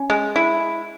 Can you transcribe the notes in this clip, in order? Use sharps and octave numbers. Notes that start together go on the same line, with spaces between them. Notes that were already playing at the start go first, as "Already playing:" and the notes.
Already playing: C#4
G#3
E4